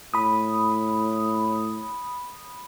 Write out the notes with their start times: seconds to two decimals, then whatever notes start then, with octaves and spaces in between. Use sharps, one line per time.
0.14 A2 B5 D#6